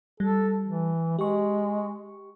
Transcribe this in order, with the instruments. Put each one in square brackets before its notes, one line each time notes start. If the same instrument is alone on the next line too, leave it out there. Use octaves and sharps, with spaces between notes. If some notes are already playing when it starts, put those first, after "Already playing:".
[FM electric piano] G3 [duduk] A4
[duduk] E3
[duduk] G#3 [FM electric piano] G4 C#6